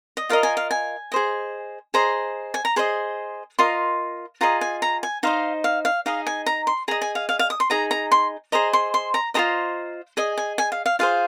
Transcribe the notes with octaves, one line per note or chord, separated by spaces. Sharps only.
D#5
F4 A#4 D#5 F5
G#5
F5
G#5
G#4 C5 D#5
G#4 C5 D#5 A#5
G#5
A#5
G#4 C5 D#5 C6
F4 A#4 D#5 C6
F4 G#4 D#5 A#5
G#5
A#5
G#5
D#4 C5 D#5 F5
F5
F5
D#4 G#4 D#5 F5
G#5
A#5
C6
G#4 D#5 A#5
G#5
F5
F5
F5
D#6
C6
D#4 G#4 D#5 A#5
A#5
C6
G#4 C5 D#5 A#5
C6
C6
A#5
F4 G#4 C5 D#5 A#5
G#4 D#5 G#5
G#5
G#5
F5
F5
F4 G#4 C5 F5